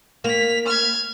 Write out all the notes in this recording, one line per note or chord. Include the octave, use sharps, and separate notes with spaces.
A#3 B6 F7
F6 G#6